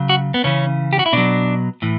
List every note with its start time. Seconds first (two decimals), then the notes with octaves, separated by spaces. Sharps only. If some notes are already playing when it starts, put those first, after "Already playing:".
Already playing: C#3 F#3
0.09 F#4
0.34 B3
0.44 C#3 E3 C#4
0.93 G4
0.99 F#4
1.06 E4
1.13 B2 F#3 D4
1.82 A2 E3